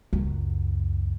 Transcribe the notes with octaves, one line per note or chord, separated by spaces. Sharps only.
C#2 F#2